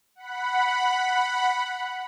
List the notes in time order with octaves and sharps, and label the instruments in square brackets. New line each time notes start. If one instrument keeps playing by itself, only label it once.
[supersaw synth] F#5 B5